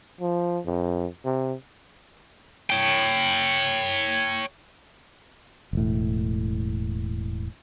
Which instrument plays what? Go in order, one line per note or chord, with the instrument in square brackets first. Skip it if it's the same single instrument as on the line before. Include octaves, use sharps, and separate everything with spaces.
[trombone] F3
F2
C3
[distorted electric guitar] C#5 G5
[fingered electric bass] E1 A2